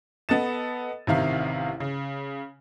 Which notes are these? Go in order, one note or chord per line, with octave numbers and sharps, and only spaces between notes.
B3 A4 D#5 A6 E7
A1 C3 D#3 E4 F5
C#3